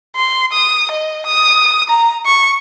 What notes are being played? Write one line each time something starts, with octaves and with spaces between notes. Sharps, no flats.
C6
D#6
D#5
D#6
A#5
C#6